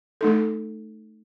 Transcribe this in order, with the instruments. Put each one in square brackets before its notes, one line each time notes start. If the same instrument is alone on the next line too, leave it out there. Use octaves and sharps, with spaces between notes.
[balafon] A3 D#4 A4